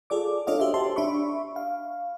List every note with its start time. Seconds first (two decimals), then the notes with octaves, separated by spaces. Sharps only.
0.10 F4 G#4 A4 D5 D6
0.47 D4 F4 A4 C#5 D#5 F5
0.60 F#4 G4 C5 E5
0.74 F#4 G4 E5 A5 C6
0.96 D4 E5 B5 C#6
1.56 F5